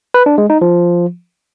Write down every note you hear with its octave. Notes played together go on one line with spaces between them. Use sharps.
B4
D4
G#3
D#4
F3